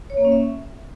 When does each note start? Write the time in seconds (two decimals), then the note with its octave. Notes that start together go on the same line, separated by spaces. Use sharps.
0.10 C#5
0.17 A#3
0.25 C#4
0.32 E5